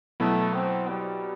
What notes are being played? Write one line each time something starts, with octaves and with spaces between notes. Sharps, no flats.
B2 F#3 A3 B3 E4
C4
G3